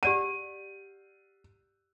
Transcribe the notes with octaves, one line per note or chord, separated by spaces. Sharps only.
G4 D5 F#5 D#7